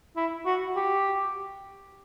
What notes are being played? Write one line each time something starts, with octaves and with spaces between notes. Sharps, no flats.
E4
F#4
G4